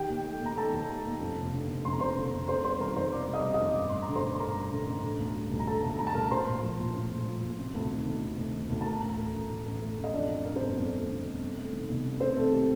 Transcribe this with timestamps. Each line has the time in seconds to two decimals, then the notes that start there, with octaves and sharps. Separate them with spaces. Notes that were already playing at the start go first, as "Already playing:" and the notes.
Already playing: D#3 G4 G5
0.09 D#2
0.25 A3
0.41 D#2 A#5
0.57 D#3 A4 A5
0.73 D#2
0.90 A3
1.05 D#2
1.21 F2
1.36 F1
1.53 D3
1.69 F1
1.85 F2 C6
1.92 A#5
2.00 F1 C5 C6
2.17 D3
2.33 F1
2.48 C3 C5 C6
2.64 G3 C5 C6
2.80 D#3 A#4 A#5
2.96 F2 C5 C6
3.12 C3 D5 D6
3.28 G3
3.33 D#5 D#6
3.44 D#3
3.54 D#5 D#6
3.60 F2
3.76 G2 D6
3.89 A1 C6
4.02 A#5
4.08 D3
4.15 C5 C6
4.23 A1
4.34 C6
4.40 G2 A#4 A#5
4.55 A1
4.72 D3
4.87 A1
5.04 D3
5.19 D2
5.36 G3
5.51 D2
5.60 A#5
5.67 D3 A4 A5
5.83 D2
5.99 G3 A#5
6.07 A5
6.14 D2 A#4 A#5
6.30 A2 C5 C6
6.47 A#1
6.63 F3
6.79 A#1
6.95 A2
7.11 A#1
7.26 F3
7.42 A#1
7.58 C3
7.74 D2
7.91 D#3
8.07 D2
8.22 C3
8.38 D2
8.54 D#3
8.70 D2
8.81 A5
8.86 A2 A#4 A#5
9.02 A1
9.17 A3
9.34 A1
9.50 A2
9.66 A1
9.82 A3
9.97 A1
10.04 D#5
10.13 F2 D4 D5
10.29 A3
10.45 D3 A#4
10.56 C4 C5
10.61 G1
10.77 F2
10.93 A3
11.09 D3
11.25 G1
11.41 C3
11.57 A3
11.73 D#3
11.89 C2
12.04 C3
12.20 A3 C4 C5
12.36 D#3 A3 A4
12.52 G4